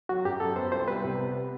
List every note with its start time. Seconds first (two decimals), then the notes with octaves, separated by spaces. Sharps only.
0.09 F#3 F#4
0.25 F#2 G4
0.40 F#2 A4
0.56 B3 C5
0.72 C2 C5
0.88 G3 B4
1.04 C3
1.19 B3